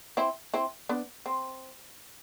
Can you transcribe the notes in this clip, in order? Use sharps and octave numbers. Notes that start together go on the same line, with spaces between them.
C4 E4
C4 E4
B3 D4
C4